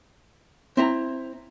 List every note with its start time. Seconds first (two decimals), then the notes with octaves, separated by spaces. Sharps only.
0.77 C4 E4 A#5